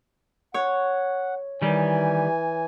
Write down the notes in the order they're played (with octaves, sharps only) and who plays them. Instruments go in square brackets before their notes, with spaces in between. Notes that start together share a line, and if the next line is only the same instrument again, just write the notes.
[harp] C#5 [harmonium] F#5
[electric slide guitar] D#3 G3 [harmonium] E3 G#5